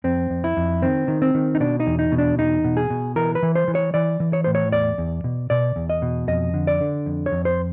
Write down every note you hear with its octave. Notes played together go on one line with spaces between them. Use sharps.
F2 C4
F2
E4
F2
D#3 C4
D#3
C4
D#3
D#4
B2 D4
D#4
E2
D#4
B2
D4
E2 D#4
B2
G#4
B2
E3 A#4
B4
E3
C5
E3
C#5
E3 D5
E3
C#5
A2 C5
C#5
E2 D5
E2
B2
B2 D5
E2
D#5
B2
F2 D#5
D3
D5
D3
F2
C#5
F2
C5